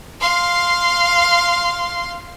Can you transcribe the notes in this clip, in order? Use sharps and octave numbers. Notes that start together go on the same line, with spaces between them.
F5 C6